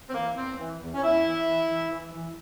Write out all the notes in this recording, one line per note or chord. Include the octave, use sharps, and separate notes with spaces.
C4
E3 A#3
E2 C4
E3
E2
C#4
E2 E4
E3
E3
E3
E3
E3